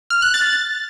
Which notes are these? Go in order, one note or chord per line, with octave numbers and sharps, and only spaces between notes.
F6
F#6
A6